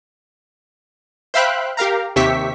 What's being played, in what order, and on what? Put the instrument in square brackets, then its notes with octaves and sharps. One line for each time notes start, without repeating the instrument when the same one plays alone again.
[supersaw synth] C5 E5 F5 G5 B5 F#6
G4 A#4 F5 A#5
D#2 C3 G4 E5 C#6 B6